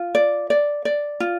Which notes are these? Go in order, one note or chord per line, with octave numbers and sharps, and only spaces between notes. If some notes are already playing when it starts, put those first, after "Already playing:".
Already playing: F4
D5
D5
D5
F4